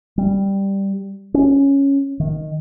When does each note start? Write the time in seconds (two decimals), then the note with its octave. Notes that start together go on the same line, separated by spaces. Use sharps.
0.18 G3
1.34 C#4
2.20 D#3